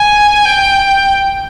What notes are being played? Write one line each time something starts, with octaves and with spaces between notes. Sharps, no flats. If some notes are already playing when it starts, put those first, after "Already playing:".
Already playing: G#5
G5